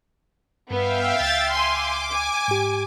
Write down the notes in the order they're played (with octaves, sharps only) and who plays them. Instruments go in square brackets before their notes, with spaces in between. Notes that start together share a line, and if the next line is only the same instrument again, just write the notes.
[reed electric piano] G2 [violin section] B3 [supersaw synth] E5 F5 G5
[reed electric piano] C#2 [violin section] A6
[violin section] G#5 C6 [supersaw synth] D6
[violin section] G#5
[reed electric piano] G#2 G4